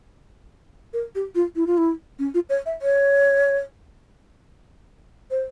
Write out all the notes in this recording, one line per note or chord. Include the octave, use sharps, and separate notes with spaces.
A#4
G4
F4
E4
F4
E4
C#4
F4
C#5
E5
C#5
C5